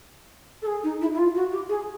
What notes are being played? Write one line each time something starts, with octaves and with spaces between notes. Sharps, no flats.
A4
G#4
D#4
E4
E4
F4
F#4
G4
G#4